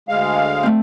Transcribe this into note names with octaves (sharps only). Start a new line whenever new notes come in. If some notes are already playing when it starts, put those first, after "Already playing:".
D2 G#3 F5
A3 C4